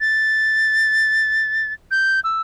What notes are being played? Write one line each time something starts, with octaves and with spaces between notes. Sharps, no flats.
A6
G6
E6